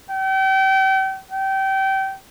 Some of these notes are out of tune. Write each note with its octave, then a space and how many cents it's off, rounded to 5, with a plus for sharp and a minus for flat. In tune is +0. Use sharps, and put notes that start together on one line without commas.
G5 -35
G5 -25